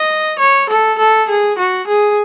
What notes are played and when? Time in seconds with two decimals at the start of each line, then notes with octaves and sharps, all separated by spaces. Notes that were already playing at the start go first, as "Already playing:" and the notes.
Already playing: D#5
0.39 C#5
0.69 A4
0.99 A4
1.29 G#4
1.58 F#4
1.87 G#4